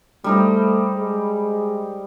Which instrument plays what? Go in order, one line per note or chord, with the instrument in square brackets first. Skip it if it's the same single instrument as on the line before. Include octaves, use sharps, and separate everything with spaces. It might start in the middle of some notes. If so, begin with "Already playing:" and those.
[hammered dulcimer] G3 D#4 C5 [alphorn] A3
[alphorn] G#3